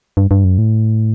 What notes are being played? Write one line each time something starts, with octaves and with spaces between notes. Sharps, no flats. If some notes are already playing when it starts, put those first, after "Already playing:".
G2
G2
F#2
A2